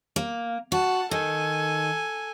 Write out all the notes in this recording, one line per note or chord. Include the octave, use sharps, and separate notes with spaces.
A#3
F#4 F#5 A5
D#3 A4 G#5